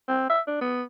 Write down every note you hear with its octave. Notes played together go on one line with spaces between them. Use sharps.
C4
E5
D4
B3